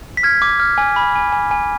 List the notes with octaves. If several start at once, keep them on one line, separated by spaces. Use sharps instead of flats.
B6
F6 G#6
D6
F6
G#5
B5
G#5
G#5
G#5